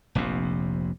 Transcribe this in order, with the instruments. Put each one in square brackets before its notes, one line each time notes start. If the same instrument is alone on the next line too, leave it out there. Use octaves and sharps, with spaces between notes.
[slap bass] F1 A#1 F2 C3